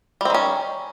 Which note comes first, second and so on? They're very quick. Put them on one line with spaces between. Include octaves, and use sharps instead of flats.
G3 C4 D#3 C#4